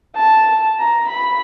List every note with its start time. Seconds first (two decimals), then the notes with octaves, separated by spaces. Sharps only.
0.16 A5
0.79 A#5
1.09 B5